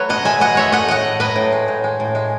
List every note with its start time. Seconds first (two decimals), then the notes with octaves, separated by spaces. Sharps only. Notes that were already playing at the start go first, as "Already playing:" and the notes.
Already playing: F#3 A3 B4 C#5
0.09 B2 D#5 F#5
0.25 G#3 E5 G#5
0.40 B2 D#5 F#5
0.55 G#3 C#5 E5
0.72 A3 D#5 F#5
0.86 A2 D#5 F#5
1.05 A2
1.20 F#3 B4 D#5
1.36 A2
1.52 G#3
1.68 A2
1.84 G#3
2.00 A2
2.15 G#3